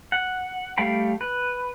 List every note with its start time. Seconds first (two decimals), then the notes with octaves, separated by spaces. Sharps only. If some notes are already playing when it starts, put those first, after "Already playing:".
0.12 F#5
0.78 G3 A3 F5 G5 B5
1.21 B4